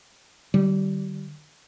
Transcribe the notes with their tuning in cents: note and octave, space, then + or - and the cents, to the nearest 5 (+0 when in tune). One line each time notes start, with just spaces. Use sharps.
D3 +35 G3 -30